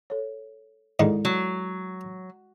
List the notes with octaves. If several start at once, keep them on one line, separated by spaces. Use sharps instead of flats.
A4 C#5
G#2 D3 D#3 G#3 E4 A4
F#3